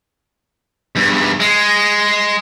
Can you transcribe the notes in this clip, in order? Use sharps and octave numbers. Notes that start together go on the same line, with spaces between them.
E2 G2
G#3